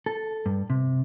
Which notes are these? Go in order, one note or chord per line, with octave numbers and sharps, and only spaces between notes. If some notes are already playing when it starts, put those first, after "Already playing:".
A4
G2
C3